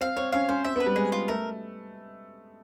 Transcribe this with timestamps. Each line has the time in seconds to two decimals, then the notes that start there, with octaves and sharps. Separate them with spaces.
0.01 C4 F5
0.17 C4 C#5
0.32 C#4 F5
0.49 C#4 C5
0.64 C4 E5
0.76 B3
0.80 B4
0.86 G3
0.96 G#3 G#4
1.12 F4
1.28 A3 A#4